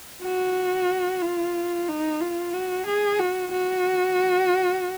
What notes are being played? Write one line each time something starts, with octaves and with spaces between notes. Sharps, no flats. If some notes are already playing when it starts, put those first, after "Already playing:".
F#4
F4
D#4
F4
F#4
G#4
F#4
F#4